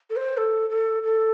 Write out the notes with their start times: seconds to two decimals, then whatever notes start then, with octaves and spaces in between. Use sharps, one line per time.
0.09 A4
0.16 C5
0.37 A4
0.69 A4
1.03 A4